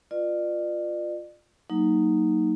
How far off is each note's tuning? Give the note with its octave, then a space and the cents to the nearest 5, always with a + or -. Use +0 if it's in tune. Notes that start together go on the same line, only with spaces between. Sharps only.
F4 +0 B4 +0 D5 +40
F#3 +0 A#3 -15 D#4 +0